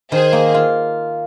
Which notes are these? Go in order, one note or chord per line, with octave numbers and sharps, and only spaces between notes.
D#3 G#4 C5
A#3
F4